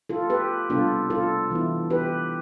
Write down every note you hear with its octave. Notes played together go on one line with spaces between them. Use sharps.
F4 A4
G4 B4
C3 G3 B3 D4 F4 A4
F4 A4
E3 B3 E4
G4 B4